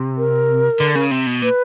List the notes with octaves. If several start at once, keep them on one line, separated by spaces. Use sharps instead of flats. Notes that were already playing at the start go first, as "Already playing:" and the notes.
Already playing: C3
A#4
D3
C#3
C3
B2
A#2 B4